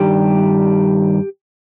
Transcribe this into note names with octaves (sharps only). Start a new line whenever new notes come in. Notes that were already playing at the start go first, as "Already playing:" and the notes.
Already playing: G2 D#3 G3 G4